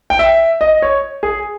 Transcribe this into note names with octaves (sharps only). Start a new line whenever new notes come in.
G5
E5
D#5
C#5
G#4